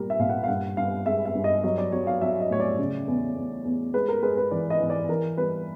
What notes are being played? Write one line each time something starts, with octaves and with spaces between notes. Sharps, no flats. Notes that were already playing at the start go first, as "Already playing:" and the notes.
Already playing: A#2 G3 A#4
E5
A#2 F5
F#5
F5
G2 F#5
G2 F5
G#3 E5
E5
G2
D#5
F#3 D#5
D5
F#3 C#5
F5
F#3 E5
D#5
A2 C#5
D5
C#3
E2
E2
E2
G#3 B4
A#4
G#3 B4
B4
E3 D5
D#5
E3
D5
E3 A#4
G3 B4